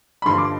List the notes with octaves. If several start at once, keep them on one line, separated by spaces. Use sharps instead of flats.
B5
G2 D3 F3 C6
D6